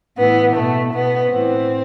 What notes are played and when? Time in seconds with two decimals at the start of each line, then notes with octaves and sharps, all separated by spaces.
0.18 A2 E3 B3
0.55 B2 A3
0.93 B2 B3
1.31 A2 E3 C4